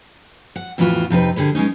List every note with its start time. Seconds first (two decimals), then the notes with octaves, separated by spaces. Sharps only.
0.56 F#5
0.78 F2 A2 E3 B3 F4 F#4
1.10 F2 C3 D#4 B4
1.36 D3 G3 G#4 B4
1.55 G#3 B3 C#4 D#4